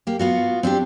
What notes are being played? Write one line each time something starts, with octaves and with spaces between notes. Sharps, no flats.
A#3 G4
B3 F4 F#4
C4 D4 F#4 G4